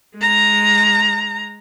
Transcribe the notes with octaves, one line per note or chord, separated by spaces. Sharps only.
G#3 A#5